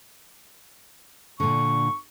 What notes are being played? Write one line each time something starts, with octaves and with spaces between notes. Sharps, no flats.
A#2 D3 C#6